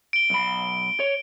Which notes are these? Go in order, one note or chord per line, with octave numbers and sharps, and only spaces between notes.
D7 G7
B1 B5
C#5